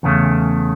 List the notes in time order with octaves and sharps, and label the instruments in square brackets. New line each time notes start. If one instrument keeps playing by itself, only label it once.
[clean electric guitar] E2 C#3 A3